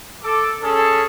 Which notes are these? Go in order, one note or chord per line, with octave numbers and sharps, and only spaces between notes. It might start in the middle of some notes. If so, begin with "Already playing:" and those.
A4 D6
C#4 G#4 A4